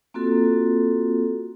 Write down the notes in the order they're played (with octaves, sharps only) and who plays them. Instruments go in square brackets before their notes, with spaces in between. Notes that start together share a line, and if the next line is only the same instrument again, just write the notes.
[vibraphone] A#3 C4 F4 F#4 A4